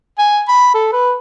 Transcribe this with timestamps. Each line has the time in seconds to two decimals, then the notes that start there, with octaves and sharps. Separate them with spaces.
0.19 G#5
0.48 B5
0.75 A4
0.93 B4